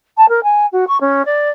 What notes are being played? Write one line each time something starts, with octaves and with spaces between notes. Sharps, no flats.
A5
A#4
G#5
F#4
C#6
C#4
D5